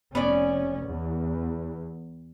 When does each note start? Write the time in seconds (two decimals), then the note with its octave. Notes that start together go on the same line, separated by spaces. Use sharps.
0.15 F1 B3 C#4 C#5 D5
0.85 E2